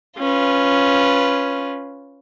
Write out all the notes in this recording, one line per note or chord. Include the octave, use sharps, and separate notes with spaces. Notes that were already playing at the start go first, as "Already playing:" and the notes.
C#4 F4 B4